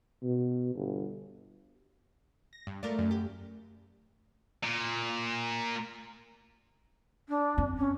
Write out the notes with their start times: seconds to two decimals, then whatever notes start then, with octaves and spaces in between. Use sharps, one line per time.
0.23 B2
0.75 G1
2.53 A#6
2.67 G2
2.83 A3 F4 A#4 D5
2.99 F#2
3.11 G4
4.63 A#2
7.29 D4
7.57 F#2 C4
7.78 C#4